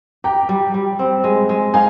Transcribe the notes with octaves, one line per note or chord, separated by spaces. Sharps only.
G4 G5 A#5
G3
G3
C4
G#3
G#3
D#4 F5 G#5